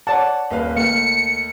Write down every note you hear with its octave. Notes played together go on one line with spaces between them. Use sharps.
C#5 D5 F#5 A5
D#1 B4 F5
D#2 A3 F5 C#7